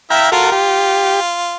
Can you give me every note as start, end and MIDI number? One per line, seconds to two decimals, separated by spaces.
0.10 0.30 64
0.10 0.30 76
0.10 0.30 77
0.10 0.30 79
0.10 0.30 82
0.32 0.51 65
0.32 0.50 66
0.32 0.50 69
0.32 0.51 70
0.52 1.57 65
0.52 1.20 67